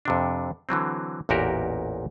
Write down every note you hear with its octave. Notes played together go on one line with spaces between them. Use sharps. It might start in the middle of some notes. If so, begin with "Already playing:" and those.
F2 C3 D4
D3 E3 F#3 C4
A1 E2 A#2 F#4 G4 A#4